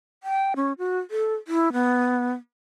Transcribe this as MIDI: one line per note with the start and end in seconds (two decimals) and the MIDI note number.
0.23 0.54 79
0.56 0.73 61
0.78 0.99 66
1.11 1.34 69
1.48 1.72 64
1.73 2.32 59